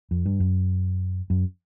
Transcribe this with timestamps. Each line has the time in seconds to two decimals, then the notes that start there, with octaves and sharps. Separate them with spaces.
0.11 F2
0.26 G2
0.40 F#2
1.30 F#2